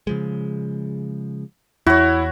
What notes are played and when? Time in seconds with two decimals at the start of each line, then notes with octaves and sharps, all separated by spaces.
0.07 C#3 F3 G#3
1.86 E2 E4 F#4 C#5